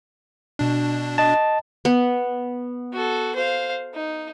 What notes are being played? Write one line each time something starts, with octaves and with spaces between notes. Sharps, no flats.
B2 D4
D#5 A5
B3
F#4 A4
C5 F5
D#4